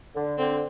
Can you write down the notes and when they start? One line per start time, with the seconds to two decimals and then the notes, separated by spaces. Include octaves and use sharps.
0.15 D3
0.38 D3 C4